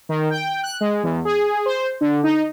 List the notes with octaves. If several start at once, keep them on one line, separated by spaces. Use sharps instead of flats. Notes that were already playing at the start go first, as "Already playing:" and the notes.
D#3
G5
F#6
G#3
E2
G#4
C5
D3
D#4